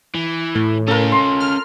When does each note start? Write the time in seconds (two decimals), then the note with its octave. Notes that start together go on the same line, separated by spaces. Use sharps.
0.15 E3
0.55 A2
0.88 C#4 F4 A4 A#4
1.12 C6
1.40 F6